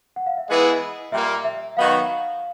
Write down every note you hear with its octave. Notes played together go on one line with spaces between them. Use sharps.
F#5
F5
E5
E3 G#3 B3 E4 G#4 D#5
A#2 G3 A#3 E5
E5
D#3 F#3 B3 D#4 F#4 F5